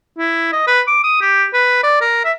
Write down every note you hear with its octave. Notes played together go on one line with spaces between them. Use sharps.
E4
D#5
B4
D6
D#6
G4
B4
D5
A#4
E5